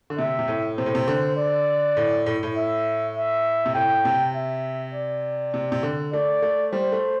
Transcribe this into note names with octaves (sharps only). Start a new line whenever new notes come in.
D3
C3 E5
C3
A2
C3 C5
A2
C3
D3
D5
A2
A2
A2
E5
E5
C3
A2 G5
C3
E5
D5
C3
C3
D3
A3 D5
A3
G3 C5
A3